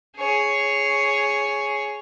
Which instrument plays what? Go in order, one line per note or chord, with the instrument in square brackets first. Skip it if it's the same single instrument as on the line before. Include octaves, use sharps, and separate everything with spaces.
[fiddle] G#4 C#5